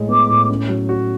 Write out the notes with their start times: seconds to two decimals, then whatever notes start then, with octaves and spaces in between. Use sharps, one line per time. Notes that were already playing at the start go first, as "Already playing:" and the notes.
Already playing: A2 G#3
0.08 B3 D6
0.30 A2
0.49 C#4
0.69 F#3
0.89 F#4